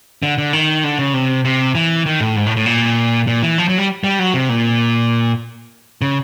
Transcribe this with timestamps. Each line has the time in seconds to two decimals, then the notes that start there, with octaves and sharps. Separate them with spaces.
0.23 D3
0.38 D3
0.53 D#3
0.84 D3
0.99 C#3
1.14 C3
1.44 C3
1.75 E3
2.06 D#3
2.20 A2
2.36 G#2
2.46 A2
2.57 A2
2.66 A#2
3.27 A#2
3.42 E3
3.58 F3
3.68 F#3
3.78 G3
4.04 G3
4.19 F#3
4.34 C3
4.49 A#2
6.02 C#3